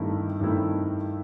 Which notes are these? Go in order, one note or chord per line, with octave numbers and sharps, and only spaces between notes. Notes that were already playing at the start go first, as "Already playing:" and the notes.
Already playing: G2 D#3 A3 C4 E4
G2 D#3 A3 C4 E4